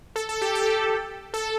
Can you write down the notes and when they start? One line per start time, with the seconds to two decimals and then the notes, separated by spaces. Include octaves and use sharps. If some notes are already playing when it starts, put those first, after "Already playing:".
0.16 A4
0.29 A4
0.42 G4
0.55 A4
1.34 A4